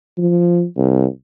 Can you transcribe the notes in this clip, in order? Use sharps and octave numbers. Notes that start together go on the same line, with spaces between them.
F3
C2